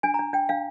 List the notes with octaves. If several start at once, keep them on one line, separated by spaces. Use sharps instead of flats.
D4 G#5
A#5
D4
D4 G5
D4 F5